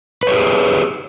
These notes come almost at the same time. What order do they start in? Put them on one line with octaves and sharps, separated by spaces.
B4 C#5 G4 G#4